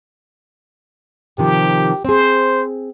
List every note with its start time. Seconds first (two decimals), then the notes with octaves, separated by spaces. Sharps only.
1.38 C3 D#3 F3 G4
2.05 C4 G#4 C5